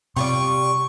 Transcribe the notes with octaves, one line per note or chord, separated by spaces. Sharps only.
C3 G3 F4 D5 C#6